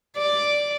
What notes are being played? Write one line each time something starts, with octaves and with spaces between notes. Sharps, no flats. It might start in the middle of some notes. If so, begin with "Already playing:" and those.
D5